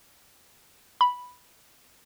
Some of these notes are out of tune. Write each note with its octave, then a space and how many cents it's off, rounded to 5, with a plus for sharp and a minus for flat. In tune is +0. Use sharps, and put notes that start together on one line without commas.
B5 -5